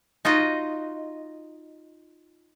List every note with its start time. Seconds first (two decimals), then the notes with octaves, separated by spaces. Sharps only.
0.25 D#4 F4 F#4 D#5